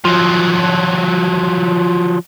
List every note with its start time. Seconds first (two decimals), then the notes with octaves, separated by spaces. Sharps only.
0.05 F3 F#3